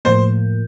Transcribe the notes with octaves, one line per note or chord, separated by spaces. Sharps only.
A2 F3 A#3 C5